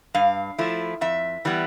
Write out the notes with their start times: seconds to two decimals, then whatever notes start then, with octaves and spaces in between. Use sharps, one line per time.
0.15 G2 F5
0.58 F3 A3 E4
1.01 F2 E5
1.45 E3 G3 B3